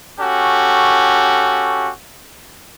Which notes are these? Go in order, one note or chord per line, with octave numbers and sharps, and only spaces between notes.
C#4 F#4 G4 A4